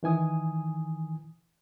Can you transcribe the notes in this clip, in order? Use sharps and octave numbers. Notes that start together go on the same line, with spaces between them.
D#3 E3 G#5 D#6